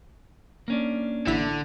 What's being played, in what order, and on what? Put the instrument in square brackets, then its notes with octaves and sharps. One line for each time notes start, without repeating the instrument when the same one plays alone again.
[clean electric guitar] A#3 C#4 D4
[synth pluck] A1 E4 B6 [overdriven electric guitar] D3